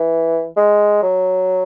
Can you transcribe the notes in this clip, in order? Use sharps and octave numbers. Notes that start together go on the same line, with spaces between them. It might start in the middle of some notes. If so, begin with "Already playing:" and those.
Already playing: E3
G#3
F#3